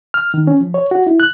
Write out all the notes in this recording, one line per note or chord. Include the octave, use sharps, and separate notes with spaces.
F6
D#3
C#4
F3
C#5
F#4
E4
F#6